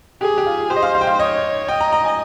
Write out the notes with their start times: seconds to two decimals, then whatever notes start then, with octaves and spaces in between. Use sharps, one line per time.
0.21 G4 G#4
0.38 G4
0.47 F4
0.70 G4 C5
0.76 D#5
0.83 F5
0.95 F5
1.01 G5
1.07 F5
1.19 C#5 D#5
1.68 D#5 G5
1.81 A#5
1.92 A#5
2.05 G#5